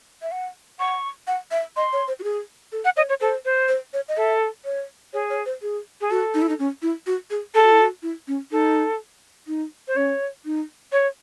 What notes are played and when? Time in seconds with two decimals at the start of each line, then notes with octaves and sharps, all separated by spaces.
0.22 E5
0.32 F#5
0.79 F#5 C#6
1.27 F#5
1.51 E5
1.76 D#5 C6
1.93 C#5
2.08 C5
2.20 F#4
2.24 G#4
2.72 A4
2.85 F#5
2.96 C#5 D#5
3.09 C#5
3.21 A4 C5
3.45 C5
3.68 C5
3.93 C#5
4.09 D#5
4.17 A4 E5
4.65 C#5
5.13 G#4 C#5
5.30 C#5
5.46 C5
5.62 G#4
6.01 G#4
6.10 F#4 A4
6.34 D#4
6.42 E4
6.49 D#4
6.59 C#4
6.82 E4
7.07 F#4
7.31 G#4
7.54 G#4 A4
7.63 F#4
7.72 E4
7.81 F#4
8.03 E4
8.28 C#4
8.51 D#4 A4
9.47 D#4
9.88 C5
9.96 C#4 C#5
10.45 D#4
10.92 C#5